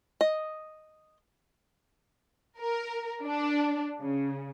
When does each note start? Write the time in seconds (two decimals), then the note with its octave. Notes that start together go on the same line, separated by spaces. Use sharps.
0.21 D#5
2.60 A#4
3.25 D4
3.98 C#3